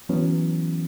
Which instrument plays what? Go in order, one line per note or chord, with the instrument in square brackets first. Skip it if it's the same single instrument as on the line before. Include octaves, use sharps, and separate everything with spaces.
[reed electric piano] E3 F#3 B3 C#4